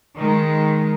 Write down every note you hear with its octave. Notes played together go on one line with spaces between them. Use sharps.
D#3 G#3